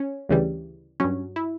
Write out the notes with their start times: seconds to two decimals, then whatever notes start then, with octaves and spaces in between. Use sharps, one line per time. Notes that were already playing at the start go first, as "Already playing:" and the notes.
Already playing: C#4
0.29 D2 C#3 E3 G3
1.00 G2 F#3 C#4
1.36 E4